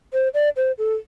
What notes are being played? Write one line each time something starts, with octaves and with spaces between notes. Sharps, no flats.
C5
D5
C5
A4